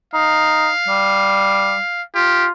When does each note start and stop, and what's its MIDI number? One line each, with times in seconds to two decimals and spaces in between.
0.14 0.69 63
0.14 2.02 77
0.88 1.76 55
2.15 2.49 65
2.15 2.47 67